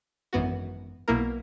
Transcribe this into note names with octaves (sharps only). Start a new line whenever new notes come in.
G#1 F#2 E3 B3 F#4
B1 B2 A#3 E4 A#4